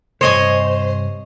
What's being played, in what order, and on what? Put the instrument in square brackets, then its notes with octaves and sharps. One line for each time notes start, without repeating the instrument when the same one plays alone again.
[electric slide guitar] G2 C3 [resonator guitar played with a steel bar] C5 [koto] C#5 D#5 G#5